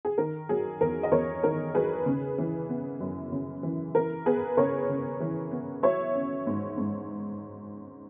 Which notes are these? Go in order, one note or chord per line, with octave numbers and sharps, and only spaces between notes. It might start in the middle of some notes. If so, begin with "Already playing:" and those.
G#4
D#3 A#4
F#3 G#4
E2 A#4
D#5
E2 A#4 C#5
D#3 A#4
F#3 G#4 B4
C#3
E3
B3
F#2
C#3
E3
E3 A#4
B3 G#4 B4
C#3 A#4 C#5
C#3
E3
B3
F#3 C#5 E5
C#4
G#2
G#2